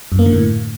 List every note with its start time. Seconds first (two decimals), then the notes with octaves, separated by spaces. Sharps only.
0.12 F#2
0.19 A#3
0.26 D3
0.33 A2